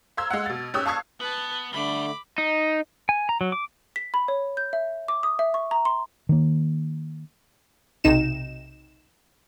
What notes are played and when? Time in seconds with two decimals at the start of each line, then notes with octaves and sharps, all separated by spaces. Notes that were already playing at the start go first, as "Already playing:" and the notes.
0.17 F5 A#5 C6 E6 G#6
0.30 G#3 F5 F#5
0.46 B2 A6
0.74 G#2 C#4 G4 D#6 E6 F#6
0.86 F5 A5 C#6 D#6 G#6 C7
1.20 B3 B4 A5
1.73 D3 G3 A3 B5 D6
2.38 D#4
3.09 G#5
3.29 A#5
3.41 F#3
3.52 D6
3.96 B6
4.14 B5
4.28 C#5
4.57 G6
4.73 E5
5.08 D6
5.23 D#6
5.39 E5
5.54 C#6
5.71 A#5
5.85 C6
6.29 D#3 A#3
8.04 B1 C3 D#4 E7